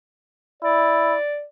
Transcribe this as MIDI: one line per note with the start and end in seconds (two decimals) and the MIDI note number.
0.63 1.16 64
0.63 1.45 74